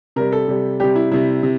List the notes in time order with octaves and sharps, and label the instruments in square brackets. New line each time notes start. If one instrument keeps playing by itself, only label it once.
[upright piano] C3 G3 A#4
A4
C3 G3
C3 G3 G4
E4
C3 G3 E4
C3